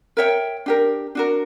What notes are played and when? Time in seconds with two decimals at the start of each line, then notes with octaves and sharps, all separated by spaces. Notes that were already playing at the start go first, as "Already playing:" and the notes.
0.17 A#4 C#5 E5 G5
0.66 D4 G4 A#4
1.15 D4 F#4 A#4